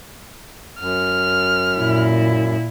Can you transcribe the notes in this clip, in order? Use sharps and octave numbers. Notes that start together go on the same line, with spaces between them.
F#2 F6
A#2 E4